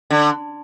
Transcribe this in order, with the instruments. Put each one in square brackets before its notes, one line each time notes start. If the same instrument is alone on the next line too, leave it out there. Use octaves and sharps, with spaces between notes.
[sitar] D3